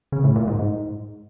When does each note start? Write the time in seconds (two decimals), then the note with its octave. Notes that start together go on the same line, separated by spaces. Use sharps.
0.12 C#3
0.24 A2
0.36 A#2
0.47 G#2
0.59 G#2